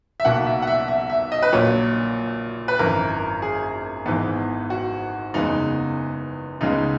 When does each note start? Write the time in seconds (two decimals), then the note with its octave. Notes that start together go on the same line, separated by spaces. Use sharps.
0.20 E5
0.25 B1 B2 A#3 F#5
0.46 E5
0.62 F#5
0.67 E5
0.88 E5
1.10 E5
1.32 D#5
1.42 B4
1.53 A#1 A#2 F#3 C#5
2.68 B4
2.79 G#1 F#2 E3 A#4
3.42 G#4
4.06 G#1 G#2 E3 B3
4.70 F#4
5.34 F#1 E2 C#3 G#3 B3 D#4
6.61 C#2 C#3 G#3 B3 D#4